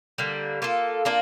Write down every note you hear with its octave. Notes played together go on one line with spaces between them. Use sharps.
D3 G3 A#3
A#3 F4 A4
A#3 D4 F4